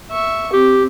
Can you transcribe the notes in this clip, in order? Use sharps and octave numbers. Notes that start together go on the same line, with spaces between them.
E5 C#6
C4 G4